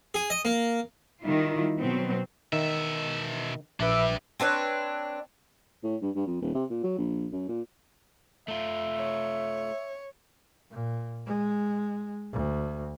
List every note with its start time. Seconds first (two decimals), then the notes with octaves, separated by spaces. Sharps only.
0.14 G#4
0.30 D#5
0.45 A#3
1.22 D#3 G3 E4 F4
1.79 B2 F#3 B3 C4
2.53 B2 D#3 E5
3.80 A#1 D4 G4 B4 E5
4.40 C4 D4 B4 C#5
5.83 A2
6.02 G2
6.15 G2
6.27 F2
6.41 D#1
6.55 C3
6.70 A#2
6.83 F#3
6.98 A#1
7.32 F#2
7.48 A#2
8.48 A3 F4 E5
8.99 C#5
10.71 A#2
11.26 G#3
12.32 D2